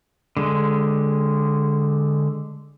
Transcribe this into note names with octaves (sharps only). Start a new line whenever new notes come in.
D3 G#3